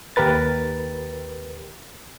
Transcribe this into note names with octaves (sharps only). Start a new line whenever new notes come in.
D#2 G4 A#4 B4 A6